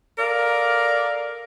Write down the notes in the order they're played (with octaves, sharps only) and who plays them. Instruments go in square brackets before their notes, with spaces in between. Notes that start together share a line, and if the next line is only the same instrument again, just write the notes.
[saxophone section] A4 A#4 D5 F5